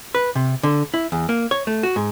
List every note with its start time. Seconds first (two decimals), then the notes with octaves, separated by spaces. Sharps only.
0.15 B4
0.35 C3
0.63 D3
0.94 E4
1.12 E2
1.29 A#3
1.51 C#5
1.67 A3
1.83 F#4
1.96 G#2